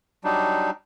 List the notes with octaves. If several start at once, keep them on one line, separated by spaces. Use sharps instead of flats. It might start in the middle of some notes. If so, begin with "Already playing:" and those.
F#3 G3 D4 D#4